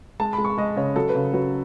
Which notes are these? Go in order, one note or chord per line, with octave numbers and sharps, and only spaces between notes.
G#3 A5
B5
G#3
C#6
G#3 D#5
C#3 C#5
F#3 A4
B4
C#3
F#3 B4